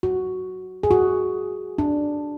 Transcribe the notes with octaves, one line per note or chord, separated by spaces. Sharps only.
F#4
G#4
F#4
D4